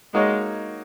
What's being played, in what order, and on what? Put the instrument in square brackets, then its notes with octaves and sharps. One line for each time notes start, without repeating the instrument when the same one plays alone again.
[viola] G#3 [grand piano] A#3 D#4 F#4 C#5